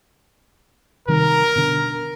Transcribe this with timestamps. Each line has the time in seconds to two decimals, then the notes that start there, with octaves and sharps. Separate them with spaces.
1.08 C3 D#3 G3 A#4
1.56 B2 D3